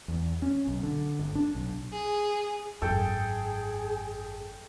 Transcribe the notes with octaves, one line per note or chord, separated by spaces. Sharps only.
E2
C#4
B1
D3
G1
D4
B1
G#4
G#1 F#2 G#4 A4 G5